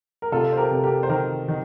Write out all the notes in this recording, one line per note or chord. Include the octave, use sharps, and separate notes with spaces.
A#4
C3 F4 A4
C5
G4 A#4
C3 A4
G4 A#4
C5
D#3 G4 A#4
D#3